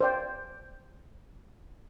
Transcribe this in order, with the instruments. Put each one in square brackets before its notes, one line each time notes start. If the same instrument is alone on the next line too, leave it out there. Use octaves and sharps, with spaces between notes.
[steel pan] C5 D5 G5